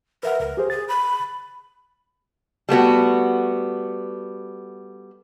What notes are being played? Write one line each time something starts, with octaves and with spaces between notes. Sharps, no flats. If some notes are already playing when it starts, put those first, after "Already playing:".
A#4 B4 E5 F#5
C#2 A#4
G4 G#4 C5
G#4 A6
B5
G3 A3 B3 F#4